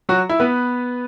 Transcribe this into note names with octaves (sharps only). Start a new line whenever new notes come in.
F#3 F#4
E4
B3 B4